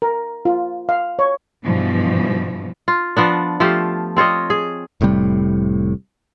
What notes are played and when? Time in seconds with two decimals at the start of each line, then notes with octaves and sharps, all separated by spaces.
0.02 A#4
0.45 F4
0.89 F5
1.19 C#5
1.65 G2 B2 E3 F3
2.88 F4
3.17 F3 B3 D4
3.60 F3 A3 F4 G4
4.17 C4 F4 C#5 D#5
4.50 G#4
5.01 F1 A2 C3 G3